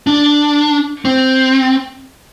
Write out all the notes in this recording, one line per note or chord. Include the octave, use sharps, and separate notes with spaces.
D4
C4